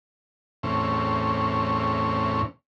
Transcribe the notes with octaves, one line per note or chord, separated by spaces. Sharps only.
E2 A2 C4 C#4